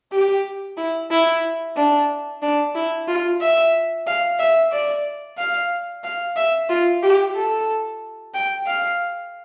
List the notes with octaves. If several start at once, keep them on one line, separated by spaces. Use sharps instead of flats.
G4
E4
E4
D4
D4
E4
F4
E5
F5
E5
D5
F5
F5
E5
F4
G4
A4
G5
F5